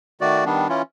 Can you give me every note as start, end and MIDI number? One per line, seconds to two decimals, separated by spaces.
0.21 0.44 51
0.21 0.44 57
0.21 0.44 66
0.21 0.44 74
0.45 0.68 51
0.45 0.68 55
0.45 0.68 59
0.45 0.68 62
0.69 0.82 52
0.69 0.82 61
0.69 0.82 64
0.69 0.82 65